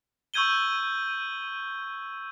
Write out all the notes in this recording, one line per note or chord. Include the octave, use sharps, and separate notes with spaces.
C#6 E6 G6 G#6 D#7 G7